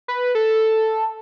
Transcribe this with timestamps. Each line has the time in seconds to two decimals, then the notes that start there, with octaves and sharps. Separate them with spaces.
0.08 B4
0.35 A4